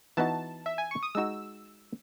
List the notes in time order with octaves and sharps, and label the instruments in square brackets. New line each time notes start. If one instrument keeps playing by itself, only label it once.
[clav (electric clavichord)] E3 B3 D#4 F#4 [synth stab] A5
[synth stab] E5
G#5
C#6
D#6
[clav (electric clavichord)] G#3 D#4 F#4 [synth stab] E6